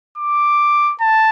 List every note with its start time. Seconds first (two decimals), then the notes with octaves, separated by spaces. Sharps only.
0.17 D6
1.01 A5